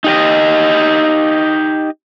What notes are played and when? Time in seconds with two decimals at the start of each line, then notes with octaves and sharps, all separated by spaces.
0.04 D#4 G4 D#5